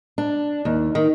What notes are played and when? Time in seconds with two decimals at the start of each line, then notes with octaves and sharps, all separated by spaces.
0.18 D4
0.65 D#2
0.95 D#3